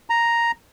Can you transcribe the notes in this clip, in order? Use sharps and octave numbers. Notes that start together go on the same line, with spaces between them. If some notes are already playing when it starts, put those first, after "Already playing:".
A#5